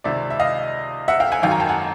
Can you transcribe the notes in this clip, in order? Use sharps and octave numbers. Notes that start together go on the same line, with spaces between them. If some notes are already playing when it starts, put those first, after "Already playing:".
C#2 C3 D#3 D5 E5
E5
D#5 F5
E5 F#5
F5 G5
F#5 G#5
G#1 F#2 D#3 F5 G5
G#5 A#5
G5 A5
F#5 G#5